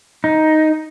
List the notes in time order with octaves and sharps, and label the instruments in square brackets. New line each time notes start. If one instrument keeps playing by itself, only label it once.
[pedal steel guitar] D#4